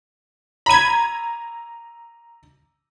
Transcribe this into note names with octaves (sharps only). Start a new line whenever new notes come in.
A#5 B5 G#6 D#7